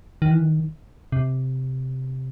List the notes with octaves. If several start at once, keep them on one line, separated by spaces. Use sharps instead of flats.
D#3
E3
D#3
C3